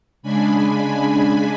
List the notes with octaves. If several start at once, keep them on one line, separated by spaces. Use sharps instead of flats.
C#3 G#3 D4 G#5 B5